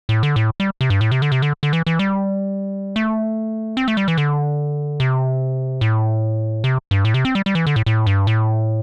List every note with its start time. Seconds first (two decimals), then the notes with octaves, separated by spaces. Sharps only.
0.09 A2
0.23 D3
0.36 A2
0.60 G3
0.81 C3
0.90 G2
1.01 A2
1.12 C3
1.22 D3
1.32 C3
1.42 D3
1.63 D3
1.73 E3
1.87 E3
1.99 G3
2.96 A3
3.77 C4
3.88 A3
3.97 G3
4.08 E3
4.18 D3
5.00 C3
5.81 A2
6.64 C3
6.91 G2
7.05 A2
7.14 C3
7.25 C4
7.35 G3
7.46 G3
7.55 E3
7.67 D3
7.76 A2
7.86 A2
8.07 G2
8.27 A2